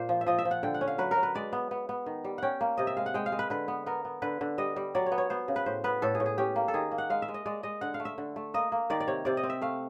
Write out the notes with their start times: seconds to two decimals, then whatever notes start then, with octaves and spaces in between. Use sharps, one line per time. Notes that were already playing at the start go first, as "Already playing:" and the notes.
Already playing: A#2 C5
0.09 F3
0.21 E5
0.26 F3 D#5
0.39 E5
0.45 F3
0.51 F#5
0.63 D3 G5
0.74 F#5
0.81 C#4
0.88 F5
0.98 F#3 B4
1.11 A#4
1.17 F#3
1.23 B4
1.35 G#3 D5
1.53 B3
1.71 B3
1.89 B3
2.06 D#3
2.24 G3
2.38 C#4 F#5 G5
2.61 A#3
2.77 C3 D#5
2.87 E5
2.97 G#3 F5
3.06 F#5
3.14 G#3 G5
3.26 F5
3.32 G#3
3.39 B4
3.50 D3 B4
3.68 B3
3.86 B3 A#4
4.05 B3
4.22 D3 B4
4.41 D3
4.58 G3 D#5
4.76 G3
4.95 F#3 D5
5.06 C#5
5.12 B3
5.18 C#5
5.30 B3 C5
5.48 C#3
5.56 B4
5.66 A2 C5
5.84 B3 B4
6.02 A2 A4
6.15 G#4
6.20 A2
6.26 G#4
6.38 C#4 G4
6.56 A#3
6.68 A4
6.74 D#3 G#4
6.91 A#3
6.98 F#5
7.10 G#3 F5
7.22 E5
7.28 G#3
7.34 D#5
7.46 G#3 D5
7.63 G#3 D#5
7.81 D3 F#5
7.94 F5
8.00 A3
8.05 E5
8.18 D3
8.36 A3
8.54 A#3 D#5
8.72 A#3
8.90 D#3 D5
9.00 D5
9.07 C3 C#5
9.25 C3 D5
9.37 D#5
9.43 C4
9.50 E5
9.62 A3 F5